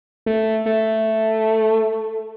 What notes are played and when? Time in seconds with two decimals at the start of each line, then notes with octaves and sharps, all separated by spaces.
0.26 A3
0.66 A3